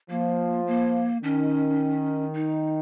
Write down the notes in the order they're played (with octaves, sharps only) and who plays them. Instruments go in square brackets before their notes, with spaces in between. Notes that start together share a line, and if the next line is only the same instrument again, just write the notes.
[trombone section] F3 [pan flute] A#3
[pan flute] A#3
[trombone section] D#3 [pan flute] C#4
[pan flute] D#4